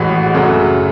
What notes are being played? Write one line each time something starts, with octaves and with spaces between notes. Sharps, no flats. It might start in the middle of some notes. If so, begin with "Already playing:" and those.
Already playing: A1 A2 E3 G#3 F#4
F#2 C#3 F#3 A3